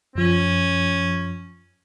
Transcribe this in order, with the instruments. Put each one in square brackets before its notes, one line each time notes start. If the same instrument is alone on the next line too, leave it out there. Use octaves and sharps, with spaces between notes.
[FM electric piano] F#2 F3 [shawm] C#4